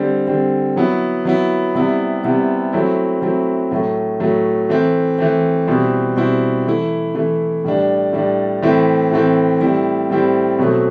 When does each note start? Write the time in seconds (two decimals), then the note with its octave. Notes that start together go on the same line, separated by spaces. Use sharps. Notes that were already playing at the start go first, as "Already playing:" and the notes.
Already playing: D3 G3 C4
0.27 D3 G3 C4
0.76 F#3 B3 E4
1.25 F#3 B3 E4
1.74 C3 G3 B3 E4
2.24 C3 G3 B3 E4
2.73 F#3 A3 C4 E4
3.22 F#3 A3 C4 E4
3.71 A2 F#3 A3
4.20 A2 F#3 A3
4.69 E3 A3 C4
5.19 E3 A3 C4
5.67 B2 G3 C4 E4
6.17 B2 G3 C4 E4
6.66 E3 A3 E4
7.15 E3 A3 E4
7.64 A2 G3 D4
8.13 A2 G3 D4
8.62 A2 E3 A3 C4 E4
9.11 A2 E3 A3 C4 E4
9.61 A2 G3 C4 E4
10.10 A2 G3 C4 E4
10.59 B2 F#3 A3 C4